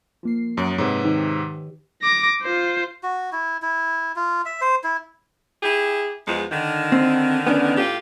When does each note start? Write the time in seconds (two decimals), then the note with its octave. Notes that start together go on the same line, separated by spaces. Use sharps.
0.23 F3 A#3 C7
0.57 F#2 F#3 D#6 C#7 D7
0.78 G#2 C3 B4 C#5 D6
1.04 D#3 D#4 G4
2.02 D6 A#6
2.42 F4 C5
3.03 F#4
3.32 E4
3.62 E4
4.16 F4
4.46 E5
4.61 C5
4.84 E4
5.62 E4 G4 G#4
6.27 E2 F3 G#3
6.52 D3 D#3
6.92 C4
7.47 B3 C#4 D4
7.76 A2 F4 G4